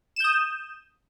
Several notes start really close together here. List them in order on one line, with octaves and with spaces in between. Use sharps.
E7 G6 D#6